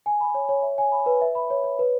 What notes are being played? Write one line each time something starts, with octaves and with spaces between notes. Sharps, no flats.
G#5
B5
C#5
C#5
E5
G#5
B5
B4
E5
B5
C#5
C#5
B4